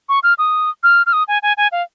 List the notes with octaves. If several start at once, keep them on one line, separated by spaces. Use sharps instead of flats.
C#6
F6
D#6
F6
F6
D#6
G#5
G#5
G#5
F5